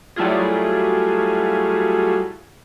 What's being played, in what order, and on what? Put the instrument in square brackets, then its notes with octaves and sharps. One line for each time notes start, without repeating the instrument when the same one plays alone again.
[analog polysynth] F#3 G3 A3 E4 F4 G#4